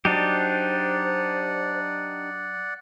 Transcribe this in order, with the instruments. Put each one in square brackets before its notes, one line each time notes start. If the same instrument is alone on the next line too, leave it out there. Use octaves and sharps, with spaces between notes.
[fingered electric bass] F#3 [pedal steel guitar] D4 D#4 G4 [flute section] C5 [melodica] D5 F#5